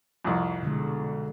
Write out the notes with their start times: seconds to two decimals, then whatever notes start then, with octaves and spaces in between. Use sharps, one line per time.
0.25 C2 F2
0.62 B2 D3 G#3